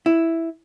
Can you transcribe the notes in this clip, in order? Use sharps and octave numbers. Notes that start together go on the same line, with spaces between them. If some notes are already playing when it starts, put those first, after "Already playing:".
E4